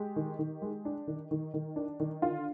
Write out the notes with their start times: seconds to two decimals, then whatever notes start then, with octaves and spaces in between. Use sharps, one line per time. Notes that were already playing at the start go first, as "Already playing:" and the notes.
Already playing: G#3 G4
0.16 D#3
0.39 D#3
0.62 G#3
0.85 D4
1.07 D#3
1.31 D#3
1.54 D#3
1.76 D4
2.00 D#3
2.22 D3 F4